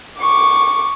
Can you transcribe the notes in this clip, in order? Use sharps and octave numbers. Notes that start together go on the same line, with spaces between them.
C#6 D6